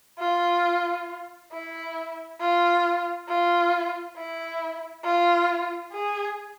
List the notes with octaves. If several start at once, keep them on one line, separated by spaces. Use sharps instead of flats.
F4
E4
F4
F4
E4
F4
G#4